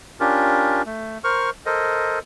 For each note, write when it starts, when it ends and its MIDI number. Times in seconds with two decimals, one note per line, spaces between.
0.20 0.82 61
0.20 0.82 62
0.20 0.82 65
0.20 0.82 67
0.20 0.82 70
0.86 1.18 57
1.24 1.50 70
1.24 1.50 72
1.24 1.50 85
1.24 1.50 89
1.66 2.19 69
1.66 2.19 70
1.66 2.19 72
1.66 2.19 75